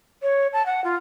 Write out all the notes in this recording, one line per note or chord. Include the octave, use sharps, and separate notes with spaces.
C#5
A5
F#5
F4